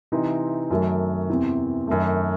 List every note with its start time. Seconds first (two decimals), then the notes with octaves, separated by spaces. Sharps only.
0.12 C3 E3 C4 D#4
0.70 F#2 D#3 F#3 A3
1.29 E2 C3 E3 C4
1.87 F#2 D#3 A3